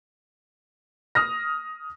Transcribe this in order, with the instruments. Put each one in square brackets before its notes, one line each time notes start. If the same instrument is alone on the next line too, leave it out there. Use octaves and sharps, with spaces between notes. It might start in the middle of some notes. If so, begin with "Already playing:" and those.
[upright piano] D#6 F6 A#6